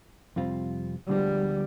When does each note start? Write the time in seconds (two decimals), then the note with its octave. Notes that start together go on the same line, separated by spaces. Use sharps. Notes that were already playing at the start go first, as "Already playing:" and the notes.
0.36 F2 C3 G3 C4 F4
1.09 D2 D3 F3 G3 G#3 B3